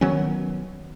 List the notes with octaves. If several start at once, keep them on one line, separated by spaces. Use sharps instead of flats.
D#3 F#3 B3 C#4